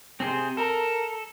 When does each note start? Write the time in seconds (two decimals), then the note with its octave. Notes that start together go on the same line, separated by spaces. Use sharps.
0.20 C3 C4 G#4 C5
0.57 A4 A#4 A#5